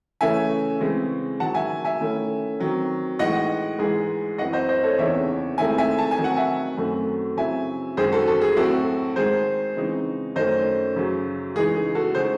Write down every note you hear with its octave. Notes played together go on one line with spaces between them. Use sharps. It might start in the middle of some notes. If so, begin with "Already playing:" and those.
C#3 E3 A3 C#4 E4 E5 G#5
C#3 E3 G#3 C4
G#2 D#3 F#3 F#5 A5
E5 G#5
E5 G#5
D#3 A3 C#4 E4
D#3 F#3 C4
A2 E3 G#3 D#4 D#5 F#5
G#2 E3 G#3 G#4
F#2 E3 C4 E4 D#5 F#5
C5 D#5
C5 D#5
A4 C#5
E2 C#3 E3 C4 D#4 C#5 E5
G#2 D#3 A3 C4 E4 E5 G#5
E5 G#5
A5
G#5
D#3 F#3 C4 D#4
F#5
E5 G#5
F#2 D#3 F#3 A3 C4
C#3 F#3 C4 E4 E5 G#5
F#2 D#3 G#3 G#4 C5
F#4 A4
F#4 A4
G#4
A2 F#3 C4 E4 F#4 A4
G#2 D#3 G#3 G#4 C5
C#3 E3 G#3 C4 D#4
F#2 D#3 A3 C#4 C5 D#5
F#2 C#3 F#3
C#3 E3 G#3 D#4 G#4
G#4
F#4 A4
C#3 G#3 D#4 G#4 C5